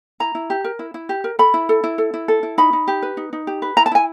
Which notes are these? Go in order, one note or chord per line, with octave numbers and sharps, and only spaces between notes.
E4 A#5
E4
G4
A#4
E4
E4
G4
A#4
A4 B5
E4
A4
E4
A4
E4
A4
E4
D#4 B5
D#4
G4
B4
D#4
D#4
G4
B4
E4 A#5
A5
E4 G#5